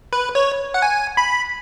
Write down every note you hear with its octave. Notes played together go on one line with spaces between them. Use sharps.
B4
C#5
F#5
G#5
B5